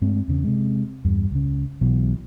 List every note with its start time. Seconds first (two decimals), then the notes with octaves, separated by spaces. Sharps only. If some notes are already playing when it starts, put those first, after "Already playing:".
0.02 G2 G#3 A3 C4
0.28 E2 C#3
0.44 C3 G#3
1.05 E2 G2
1.31 C#2 C#3
1.81 B1 B2 E3 F#3